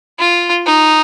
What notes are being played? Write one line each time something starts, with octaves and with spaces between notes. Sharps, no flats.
F4
D#4